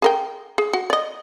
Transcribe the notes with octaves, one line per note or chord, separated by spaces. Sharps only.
G#4 A#4 G5
G#4
F#4
D5 D#5